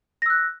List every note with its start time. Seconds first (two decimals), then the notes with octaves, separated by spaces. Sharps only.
0.22 A#6
0.26 E6
0.30 F#6